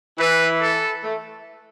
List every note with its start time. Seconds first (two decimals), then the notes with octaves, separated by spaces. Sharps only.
0.19 E3 B4
0.61 A4
1.04 A3